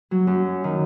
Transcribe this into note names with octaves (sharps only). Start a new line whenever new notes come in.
F#3
F#2
D#3